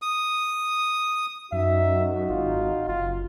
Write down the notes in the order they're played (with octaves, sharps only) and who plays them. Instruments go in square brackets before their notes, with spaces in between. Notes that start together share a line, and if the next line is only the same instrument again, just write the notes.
[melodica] D#6
[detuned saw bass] F#2 [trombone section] D#4 F#4 [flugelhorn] E5
[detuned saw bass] G#1 [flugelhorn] F4
[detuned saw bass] F#1 [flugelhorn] F4